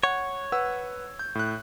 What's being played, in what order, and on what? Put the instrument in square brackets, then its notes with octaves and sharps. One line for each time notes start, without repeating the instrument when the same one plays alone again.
[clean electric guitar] C#5 [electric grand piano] F#5
[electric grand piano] B4 F#5 E6
G6
A2 F#6